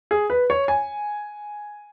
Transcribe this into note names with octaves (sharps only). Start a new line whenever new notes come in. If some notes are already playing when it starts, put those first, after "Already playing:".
G#4
B4
C#5
G#5